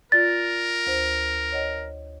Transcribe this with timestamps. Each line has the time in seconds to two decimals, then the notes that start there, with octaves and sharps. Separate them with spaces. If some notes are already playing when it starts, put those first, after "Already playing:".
0.12 F4 A#4 D5 A6
0.87 D2 C5
1.52 C#5 D#5 F#5